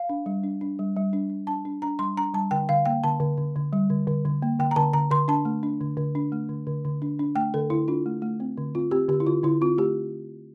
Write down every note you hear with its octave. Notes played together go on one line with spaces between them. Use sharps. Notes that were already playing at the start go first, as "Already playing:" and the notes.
Already playing: F5
D4
G3
D4
D4
G3
G3
D4
D4
D4 A5
D4
D4 A#5
G3 C6
D4 A#5
G3 A5
D3 G5
D3 F5
A#3 G5
D3 A5
D3
D3
D3
G3
D3
D3
D3
A#3
D3 G5
A#5
D3 A5
D3 A#5
D3 C6
D4 A5
A3
D4
D3
D3
D4
A3
D3
D3
D3
D4
D4
A3 G5
D3 A4
D3 E4
D4 F4
A3
A3
C4
D3
C4 F4
C4 G4
D3 G4
E4
D3 F4
D3 E4
C4 F4
A3 G4